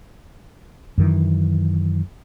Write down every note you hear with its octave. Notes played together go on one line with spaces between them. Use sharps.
F#2 D#3 E3